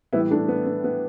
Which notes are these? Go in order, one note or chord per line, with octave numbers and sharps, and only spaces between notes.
A2 E3 G3 B3 E4
A3 D4
B3
B3
B3